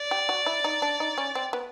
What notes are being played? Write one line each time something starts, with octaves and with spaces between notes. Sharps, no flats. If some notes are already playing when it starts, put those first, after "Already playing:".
Already playing: D5
G4
F#4
E4
D#4
D4
D#4
C#4
C4
B3